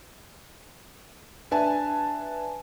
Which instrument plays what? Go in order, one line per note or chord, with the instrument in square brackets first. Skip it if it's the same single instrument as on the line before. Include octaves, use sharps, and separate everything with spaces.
[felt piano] D4 B4 E5 G#5 A5